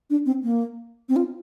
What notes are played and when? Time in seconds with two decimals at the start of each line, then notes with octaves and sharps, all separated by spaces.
0.10 D4
0.26 C4
0.43 A#3
1.09 C4
1.16 F4